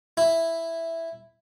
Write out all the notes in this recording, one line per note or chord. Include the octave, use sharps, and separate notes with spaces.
E4